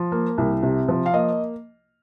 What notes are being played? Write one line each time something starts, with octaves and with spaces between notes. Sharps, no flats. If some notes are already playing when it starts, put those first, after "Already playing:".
Already playing: F3
A#3
C2
C3
F3
F5
A#3 D#5